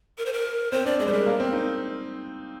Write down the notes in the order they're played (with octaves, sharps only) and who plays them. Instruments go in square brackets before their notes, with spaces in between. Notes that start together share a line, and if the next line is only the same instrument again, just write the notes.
[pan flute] A#4
C5
A#4
[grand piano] C4 [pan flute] C5
[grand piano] D4 [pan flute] D5
[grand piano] G#3 [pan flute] D5
[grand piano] G3 [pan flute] C5
[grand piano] G#3 [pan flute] A#4
[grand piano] A#3
C4
D#4